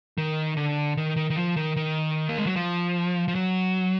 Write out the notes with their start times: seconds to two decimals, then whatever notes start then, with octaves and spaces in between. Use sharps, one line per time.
0.18 D#3
0.57 D3
0.97 D#3
1.16 D#3
1.30 D#3
1.36 F3
1.56 D#3
1.76 D#3
2.29 A#3
2.38 G#3
2.46 F#3
2.56 F3
3.28 F3
3.35 F#3